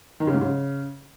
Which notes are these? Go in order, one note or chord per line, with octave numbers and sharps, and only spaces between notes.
D#3
C#3
G#2
C#3